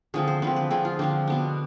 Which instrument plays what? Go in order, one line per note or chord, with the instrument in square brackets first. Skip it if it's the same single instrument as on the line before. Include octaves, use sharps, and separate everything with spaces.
[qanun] D3 F3 C4 G#4
C5
D3 F3 C4 B4
B4
D3 F3 C4 G#4
F4
D3 F3 C4 D4
B2 B3 D4